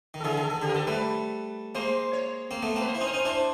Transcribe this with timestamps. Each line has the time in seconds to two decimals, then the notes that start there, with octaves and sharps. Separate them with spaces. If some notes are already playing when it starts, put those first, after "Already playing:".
0.14 D#3
0.20 A4
0.24 D3 E3 G#4
0.37 D#3
0.43 A4
0.50 D#3
0.62 D3 G4
0.69 A#4
0.75 D#3 A4
0.87 G3 A3 B4
1.75 G#3 A#3 C5
2.13 C#5
2.51 A#3 C4
2.63 A3 B3
2.76 A#3 C4
2.81 B4
2.88 C5
2.95 E4
3.01 C#4 D#4
3.07 C5
3.14 C#4 D#4
3.25 D4 E4 C5